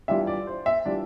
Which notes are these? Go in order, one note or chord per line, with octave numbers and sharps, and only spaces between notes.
E3 G3 D4 F4 E5
D5
C5
E5
E3 G3 D4 F4 D5